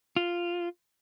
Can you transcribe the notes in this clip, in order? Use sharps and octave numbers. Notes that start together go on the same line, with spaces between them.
F4